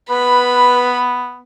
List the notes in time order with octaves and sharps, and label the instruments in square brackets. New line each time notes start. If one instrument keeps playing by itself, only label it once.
[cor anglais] B3 [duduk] B4 [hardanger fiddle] B5